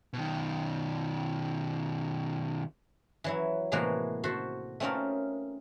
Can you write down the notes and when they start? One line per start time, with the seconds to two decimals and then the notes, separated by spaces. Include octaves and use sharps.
0.13 B2 D#3
3.24 E3 F#3 E4
3.72 A2 C3 E3 G#3 A#3 F#4
4.24 F#4 A4 C5 E5
4.80 A3 C4 C#4 D#4 F4 A#4